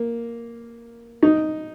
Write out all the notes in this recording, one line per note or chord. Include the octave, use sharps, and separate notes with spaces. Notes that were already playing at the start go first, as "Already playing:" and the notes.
Already playing: A#3
D#4